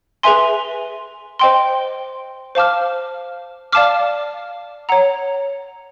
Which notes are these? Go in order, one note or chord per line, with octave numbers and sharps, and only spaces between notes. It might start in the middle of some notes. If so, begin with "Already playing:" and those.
G#4 B4 E5 G#5 C6
C5 D#5 G5 C6
C5 F5 A5 D6 F6
D5 F5 A5 D6 F6
C#5 F#5 A#5